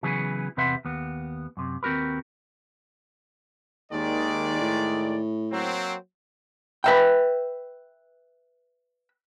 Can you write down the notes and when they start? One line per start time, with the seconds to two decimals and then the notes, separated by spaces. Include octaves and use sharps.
0.03 C#3 E3 F#3 B3 G#4
0.57 E2 C3 B4 E5 F#5 C6
0.85 D#2 B3
1.57 F#2 C3
1.83 D#2 C4 F#4 A#4 B4
3.92 D#2 D#3 G#3 D5
4.61 A2
5.51 F#3 A#3 C4
6.84 B4 E5 G5